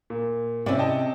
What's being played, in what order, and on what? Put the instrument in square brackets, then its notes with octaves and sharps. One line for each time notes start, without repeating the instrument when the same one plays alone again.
[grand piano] A#2
[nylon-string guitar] C3 C#4 [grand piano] C4 E4 D5
[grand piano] D#5 G5 A5